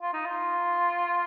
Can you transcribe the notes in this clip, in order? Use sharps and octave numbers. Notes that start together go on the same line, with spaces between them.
F4
D#4
F4